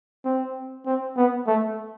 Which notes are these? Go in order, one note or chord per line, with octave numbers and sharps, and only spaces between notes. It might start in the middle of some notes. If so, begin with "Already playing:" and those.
C4
C4
B3
A3